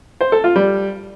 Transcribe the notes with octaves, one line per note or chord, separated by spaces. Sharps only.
C5
A4
F4
G3